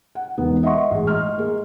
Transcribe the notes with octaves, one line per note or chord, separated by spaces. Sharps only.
F#5
E1 B3 D#4
D#5 E5 F#5 C6 C#6
A1 G#3
D#5 C6 F6
A#3 G#4